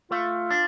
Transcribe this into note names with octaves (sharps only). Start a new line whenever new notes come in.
A3 F4
D4